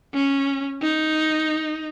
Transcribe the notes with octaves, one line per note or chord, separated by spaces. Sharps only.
C#4
D#4